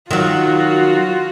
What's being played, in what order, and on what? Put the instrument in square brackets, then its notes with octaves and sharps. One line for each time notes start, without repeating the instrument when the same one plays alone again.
[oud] D#3 F#3 [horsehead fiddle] F4 F#4